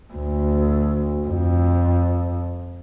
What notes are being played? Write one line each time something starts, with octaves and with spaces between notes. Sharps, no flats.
D2
F2